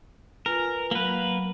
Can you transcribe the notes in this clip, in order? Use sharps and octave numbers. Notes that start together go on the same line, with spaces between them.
F4 A#4 B4 G#5
F#3 A#3 B4